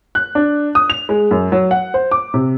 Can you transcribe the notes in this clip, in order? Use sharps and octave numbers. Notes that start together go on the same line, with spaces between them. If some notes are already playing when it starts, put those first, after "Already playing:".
F#6
D4
D#6
F7
G#3
F#2
F#3
F#5
C5
D6
C3